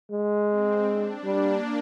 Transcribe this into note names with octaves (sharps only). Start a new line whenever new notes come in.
G#3
C4
D4
G3 A#3